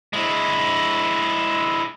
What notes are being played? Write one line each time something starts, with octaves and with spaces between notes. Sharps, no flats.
G#3 E4